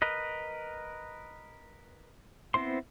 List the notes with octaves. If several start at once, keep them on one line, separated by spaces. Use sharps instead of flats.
A#4 B4 D#5
B3 C4 E4 C5 C6